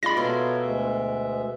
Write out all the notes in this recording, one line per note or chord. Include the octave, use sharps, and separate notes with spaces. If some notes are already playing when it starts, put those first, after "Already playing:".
G#3 F4 D5 B5 A#6
B2 A4 A#4 C#5 E5 C6
D2 G#3 E5